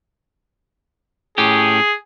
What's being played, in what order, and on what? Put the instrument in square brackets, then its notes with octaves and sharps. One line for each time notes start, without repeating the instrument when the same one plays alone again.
[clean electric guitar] A2 C#4 G4 [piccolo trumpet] G#4